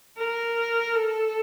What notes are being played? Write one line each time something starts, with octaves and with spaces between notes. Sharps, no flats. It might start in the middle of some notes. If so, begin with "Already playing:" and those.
A#4
A4